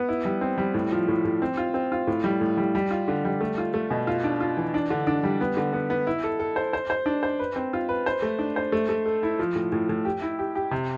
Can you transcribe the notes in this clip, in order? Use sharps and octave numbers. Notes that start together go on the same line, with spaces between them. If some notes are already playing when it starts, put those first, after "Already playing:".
Already playing: B3
E4
G3
C4
G3
A2
F3
A2
A2
C4
F4
C4
F4
A2
G3
A2
G3
G3
F4
D3
G3
A3
F4
A3
B2
F4
D4
F4
E3
D4
D3
D4
G3
B3
D3
B3
B3
E4
A4
A4
C5
C5
C5
D4
C5
B4
C4
F4
B4
C5
A3
D4
C5
A3
A3
A4
E4
F3
A2
A2
A2
G4
E4
G4
G4
C3